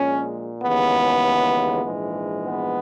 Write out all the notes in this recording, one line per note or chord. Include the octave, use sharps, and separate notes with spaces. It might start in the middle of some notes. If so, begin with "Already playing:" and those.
Already playing: A#1 A#2 G#3 C#4
D#2 C#3 E3 G#3 B3
A#1 G#2 E3 G#3
B3